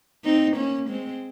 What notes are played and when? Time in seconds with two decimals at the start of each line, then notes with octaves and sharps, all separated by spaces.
0.25 C4 D#4
0.57 A#3 C#4
0.89 G#3 C4